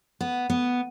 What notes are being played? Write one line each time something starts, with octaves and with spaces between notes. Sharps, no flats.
B3
B3